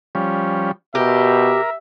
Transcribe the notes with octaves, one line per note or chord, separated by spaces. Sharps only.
F3 G3 C#4
B2 G4 A#4 E5